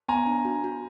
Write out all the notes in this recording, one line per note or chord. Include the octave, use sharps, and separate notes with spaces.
B3 G#5 A#5
D4
F#4
F#4